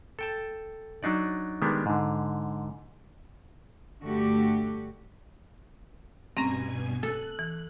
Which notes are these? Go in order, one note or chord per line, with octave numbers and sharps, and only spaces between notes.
A4 G5 A5
F#3 D4 D#4 D5
D#3 G3 G#3 B3 D4
G#2 D3
G2 D3 A3 F#4 G4
G2 B2 C4 C#4 G#5 A#5 A#6
A4 F#6
E3